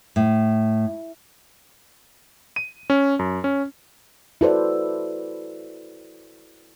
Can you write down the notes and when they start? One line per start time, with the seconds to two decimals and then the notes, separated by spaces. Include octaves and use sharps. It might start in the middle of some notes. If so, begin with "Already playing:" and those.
0.16 A2
2.56 D#7
2.90 C#4
3.19 F#2
3.44 C#4
4.41 E4 F#4 A4 B4 C5 D5